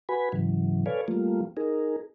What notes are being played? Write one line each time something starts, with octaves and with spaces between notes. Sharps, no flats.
F#4 B4 G#5 B5
G#2 C#3 E3 F#3
A4 B4 C#5 D5 F5 G#5
F3 G3 A3 A#3 F4
D#4 G#4 A#4